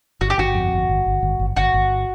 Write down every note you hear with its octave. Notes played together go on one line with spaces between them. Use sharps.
G1 F#4
G4
G1 F#4
F2
G1
G1
G1
G1
G1
G1 F#4
G1